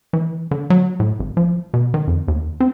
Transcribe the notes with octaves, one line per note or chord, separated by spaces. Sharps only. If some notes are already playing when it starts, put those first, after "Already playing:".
E3
D3
F#3
A2
G#1
F3
B2
D#3
F2
D#2
C4